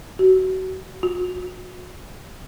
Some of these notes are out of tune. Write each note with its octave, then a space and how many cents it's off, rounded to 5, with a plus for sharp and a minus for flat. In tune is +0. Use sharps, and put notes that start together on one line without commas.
F#4 +25
F#4 -30